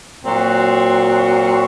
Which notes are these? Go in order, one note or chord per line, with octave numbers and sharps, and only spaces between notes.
A#2 F#3 C4 F#4